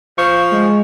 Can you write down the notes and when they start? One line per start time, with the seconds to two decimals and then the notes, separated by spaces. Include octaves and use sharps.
0.18 F3 C#6
0.52 G#3